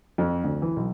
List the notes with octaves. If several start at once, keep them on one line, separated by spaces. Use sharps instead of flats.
F2
D2
E3
B1